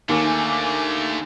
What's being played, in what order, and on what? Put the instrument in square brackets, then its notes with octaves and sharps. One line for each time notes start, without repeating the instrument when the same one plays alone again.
[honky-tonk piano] D#2 [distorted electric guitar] D3 A3 [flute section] G#5 [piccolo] D6